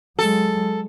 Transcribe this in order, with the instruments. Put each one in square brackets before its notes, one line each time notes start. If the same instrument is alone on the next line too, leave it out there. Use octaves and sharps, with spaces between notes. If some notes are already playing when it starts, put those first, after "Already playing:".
[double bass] F#3 G#3 [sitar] A4